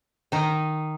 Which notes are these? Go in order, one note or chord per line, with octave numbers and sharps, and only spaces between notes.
D#3 D#4